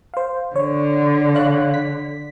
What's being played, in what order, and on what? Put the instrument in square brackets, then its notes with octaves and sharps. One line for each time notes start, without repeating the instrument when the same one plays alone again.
[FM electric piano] C5 F5
[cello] D3 [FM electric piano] C#5
[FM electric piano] C#5 F5 F#6
B6